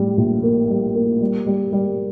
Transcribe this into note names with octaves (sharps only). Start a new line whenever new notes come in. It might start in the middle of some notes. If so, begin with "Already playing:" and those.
Already playing: A2 G3
A#1
A#3
G3
A#3
G3
G3
G3